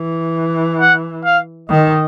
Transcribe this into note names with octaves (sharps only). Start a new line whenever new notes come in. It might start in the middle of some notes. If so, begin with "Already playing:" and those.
Already playing: E3
F#5
F5
D#3 D#5